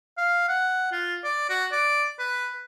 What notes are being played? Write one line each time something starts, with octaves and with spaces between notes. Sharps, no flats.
F5
F#5
F4
D5
F#4
D5
B4